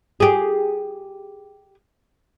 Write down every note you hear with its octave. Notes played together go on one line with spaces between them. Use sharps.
G4 G#4